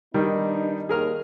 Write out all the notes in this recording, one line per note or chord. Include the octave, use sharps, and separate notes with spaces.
D#3 G3 B3 D4 D#4
D#2 G#4 A#4 F6